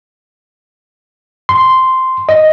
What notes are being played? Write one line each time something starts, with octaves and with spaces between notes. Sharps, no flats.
C6
D#5